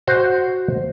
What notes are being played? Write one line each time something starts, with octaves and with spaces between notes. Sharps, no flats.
F#4 C5